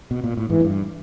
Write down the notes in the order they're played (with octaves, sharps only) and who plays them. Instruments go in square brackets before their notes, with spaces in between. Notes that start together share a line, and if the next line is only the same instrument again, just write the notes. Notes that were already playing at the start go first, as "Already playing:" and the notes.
[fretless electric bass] B2
A#2
A2
[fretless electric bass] G#2 [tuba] E3
[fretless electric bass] G#2
G2